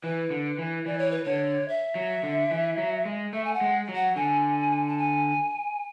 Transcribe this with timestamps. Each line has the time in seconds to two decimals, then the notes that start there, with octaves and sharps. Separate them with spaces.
0.04 E3 B4
0.31 D3
0.59 E3
0.86 E3 D5
0.98 C#5
1.11 B4
1.24 D3 C#5
1.68 E5
1.95 F#3
2.23 D3
2.51 E3
2.78 F#3
3.05 G#3
3.33 A3 E5
3.44 G#5
3.54 F#5
3.61 G#3
3.89 F#3
3.95 F#5
4.16 D3 G#5
4.88 A5
4.98 G#5